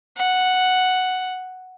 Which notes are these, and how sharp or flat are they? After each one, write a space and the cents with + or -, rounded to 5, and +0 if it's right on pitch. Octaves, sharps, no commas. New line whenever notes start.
F#5 +0